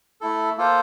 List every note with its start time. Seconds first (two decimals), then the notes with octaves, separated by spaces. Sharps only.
0.21 A3 E4 A4
0.57 A#3 F4 A4 C5